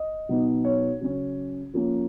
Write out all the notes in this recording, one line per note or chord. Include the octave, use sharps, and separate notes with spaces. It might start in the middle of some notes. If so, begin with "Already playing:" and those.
Already playing: D#5
B2 F#3 B3 D#4
C#5
C#3 F#3 C#4
F3 A#3 C#4